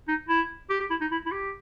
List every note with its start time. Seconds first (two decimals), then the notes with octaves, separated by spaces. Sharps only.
0.08 D#4
0.29 E4
0.70 G4
0.80 G4
0.90 E4
1.01 D#4
1.11 E4
1.26 E4
1.32 G4